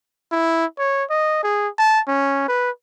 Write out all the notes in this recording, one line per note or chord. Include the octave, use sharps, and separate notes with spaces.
E4
C#5
D#5
G#4
A5
C#4
B4